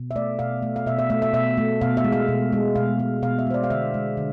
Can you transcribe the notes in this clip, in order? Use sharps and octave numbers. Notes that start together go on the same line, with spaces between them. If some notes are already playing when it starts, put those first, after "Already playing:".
Already playing: B2
E5
A3 D5
B2 F5
A3
F5
B2 E5
E5
A3 E5
E5
B2 E5
A3
B2 F5
E5
G#3
F5
B2
G#3
B2 F5
G#3
B2 F5
E5
G#3 C5
D5
F5
D3 E5
G#3
D3